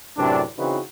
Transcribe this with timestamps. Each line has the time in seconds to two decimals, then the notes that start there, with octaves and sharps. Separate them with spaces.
0.18 F#2 A2 C3 E3 D4
0.58 C#3 E3 C4 D#4 F#4 B4